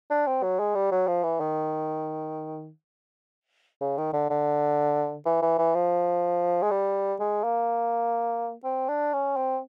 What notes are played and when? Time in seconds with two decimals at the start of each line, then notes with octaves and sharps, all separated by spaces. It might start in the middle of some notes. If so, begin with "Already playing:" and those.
0.10 D4
0.27 C4
0.43 F#3
0.60 G#3
0.75 G3
0.91 F#3
1.07 F3
1.23 E3
1.40 D#3
3.81 C#3
3.98 D#3
4.13 D3
4.30 D3
5.26 E3
5.42 E3
5.58 E3
5.75 F3
6.63 G#3
6.71 G3
7.20 G#3
7.44 A#3
8.64 C4
8.89 D4
9.13 C#4
9.36 C4